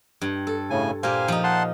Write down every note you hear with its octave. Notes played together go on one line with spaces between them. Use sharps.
G2
A4
A2 C#3 G#5
A#2 G4 C5 F5 G#5
F3 D#4
F#5 A5 C6